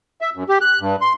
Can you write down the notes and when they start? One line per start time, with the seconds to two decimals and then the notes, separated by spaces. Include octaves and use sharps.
0.21 E5
0.36 F#2
0.49 G4
0.61 F#6
0.80 G2
1.01 C6